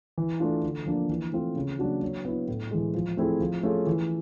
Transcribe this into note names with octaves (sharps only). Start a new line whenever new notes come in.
E3
A3 D4 F4
D3
F3 A#3 D4
E3
A3 C4 F4
C#3
F#3 A#3 D4 F#4
F#3
B3 E4
A2
E3 G#3
F3
A3 C4 E4 G#4
F3
A3 C#4 F4 G#4
E3